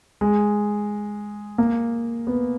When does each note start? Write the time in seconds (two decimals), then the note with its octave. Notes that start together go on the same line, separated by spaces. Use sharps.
0.21 G#3
1.58 A#3
2.27 B3